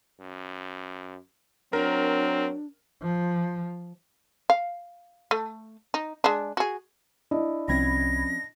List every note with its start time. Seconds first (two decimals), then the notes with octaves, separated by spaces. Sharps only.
0.20 F#2
1.73 F#3 C4 D4 A#4
3.02 F3
4.50 F5
5.31 A3
5.94 D#4
6.24 G#3 D4
6.57 F#4 G#4
7.31 D4 E4 D#5
7.68 C2 F3 C4 C#4 B5 G#6 A#6